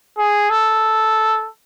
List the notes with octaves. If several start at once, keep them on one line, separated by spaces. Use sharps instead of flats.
G#4
A4